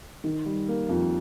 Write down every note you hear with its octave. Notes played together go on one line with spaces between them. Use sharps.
D#3
G3
A#3
F2